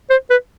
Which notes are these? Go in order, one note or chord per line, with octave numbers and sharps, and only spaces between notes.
C5
B4